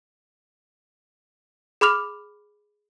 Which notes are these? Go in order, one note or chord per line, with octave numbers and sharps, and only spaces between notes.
G#4 B5 D6 F6 F7